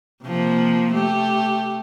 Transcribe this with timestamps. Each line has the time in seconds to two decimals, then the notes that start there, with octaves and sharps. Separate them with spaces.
0.24 C3 F3 A#3
0.94 A3 G4